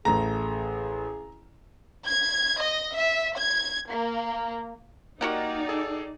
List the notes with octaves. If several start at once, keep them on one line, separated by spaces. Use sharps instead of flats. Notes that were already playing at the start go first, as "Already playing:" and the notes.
A1 A3 G#4 A#5
G#6
D#5
E5
G#6
A#3
A#3 D#4 F#4 G4 A#4 D5 F#5
G#4 A4